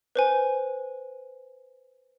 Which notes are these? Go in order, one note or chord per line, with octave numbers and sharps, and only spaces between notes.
B4 C5 G#5